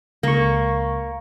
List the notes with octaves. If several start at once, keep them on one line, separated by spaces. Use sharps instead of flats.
C#2 A#3 C#6